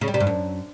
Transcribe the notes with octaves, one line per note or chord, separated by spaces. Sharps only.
C#3
G3
C3
G2
F#2